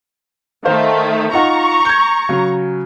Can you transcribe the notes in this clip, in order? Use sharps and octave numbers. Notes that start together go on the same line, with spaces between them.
D#3 A3 C5 F5
D#4 F4 F#5 A#5 C#6
G6 G#6
C#3 F#3